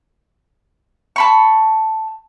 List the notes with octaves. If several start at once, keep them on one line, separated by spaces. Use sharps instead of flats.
A5 B5 C#6